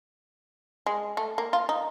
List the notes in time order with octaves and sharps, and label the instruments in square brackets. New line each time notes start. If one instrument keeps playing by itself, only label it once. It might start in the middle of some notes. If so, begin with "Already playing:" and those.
[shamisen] G#3
A3
A#3
F4
D#4